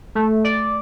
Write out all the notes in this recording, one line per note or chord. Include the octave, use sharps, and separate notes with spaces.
A3
D5